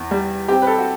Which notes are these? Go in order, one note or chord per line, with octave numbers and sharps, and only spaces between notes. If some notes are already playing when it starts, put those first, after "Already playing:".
Already playing: E2
G3
C4 G4
B4
A4
F#4